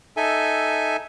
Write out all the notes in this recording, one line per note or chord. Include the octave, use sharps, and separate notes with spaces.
D#4 A4 E5 G#5